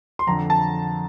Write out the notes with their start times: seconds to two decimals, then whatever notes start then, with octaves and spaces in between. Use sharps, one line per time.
0.19 C6
0.27 F2 D3 A#5
0.50 A5